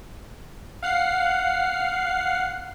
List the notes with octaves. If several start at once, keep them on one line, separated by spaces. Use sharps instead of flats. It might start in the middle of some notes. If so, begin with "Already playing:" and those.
F5 F#5 C7